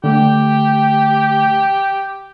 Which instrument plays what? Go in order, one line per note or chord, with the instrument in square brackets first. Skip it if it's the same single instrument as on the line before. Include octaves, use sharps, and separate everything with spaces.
[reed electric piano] D3 A3 [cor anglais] G4